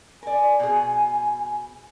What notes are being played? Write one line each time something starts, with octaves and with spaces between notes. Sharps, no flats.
A#4 D5 G#5
B2 G#4